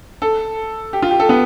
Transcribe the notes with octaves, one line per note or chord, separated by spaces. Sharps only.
A4
G4
F4
G4
A4
B3